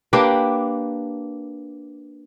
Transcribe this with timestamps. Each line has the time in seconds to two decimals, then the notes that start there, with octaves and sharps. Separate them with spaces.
0.13 A#3 D4 G4 B4